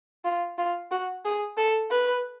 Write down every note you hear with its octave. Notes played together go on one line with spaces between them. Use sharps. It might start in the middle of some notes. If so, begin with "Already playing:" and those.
F4
F4
F#4
G#4
A4
B4